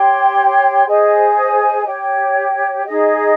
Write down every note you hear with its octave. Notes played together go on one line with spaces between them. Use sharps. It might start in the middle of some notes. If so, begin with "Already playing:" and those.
Already playing: G4 C#5 G5 C6
G#4 C5 D#5 G#5
G4 C#5 G5
D#4 G#4 D#5